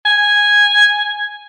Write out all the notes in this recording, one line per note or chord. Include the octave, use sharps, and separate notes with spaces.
G#5